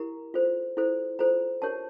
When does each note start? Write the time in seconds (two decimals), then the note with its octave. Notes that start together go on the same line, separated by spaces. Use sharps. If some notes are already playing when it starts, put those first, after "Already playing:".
Already playing: E4 G4 A#4 A#5
0.34 F4 A4 C5
0.77 E4 A4 C5
1.19 F4 A4 C5 A#5
1.62 D4 G4 A#4 C#5 A5